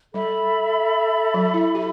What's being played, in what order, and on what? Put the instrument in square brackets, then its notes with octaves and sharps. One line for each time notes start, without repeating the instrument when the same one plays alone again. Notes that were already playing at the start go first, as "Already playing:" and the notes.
[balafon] G3 [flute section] A4 E5 B5
[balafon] F#3
E4
G4